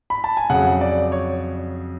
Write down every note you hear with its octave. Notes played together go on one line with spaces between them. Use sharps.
B5
A5
G#5
F2 C#3 F#3 F#5
D5
C#5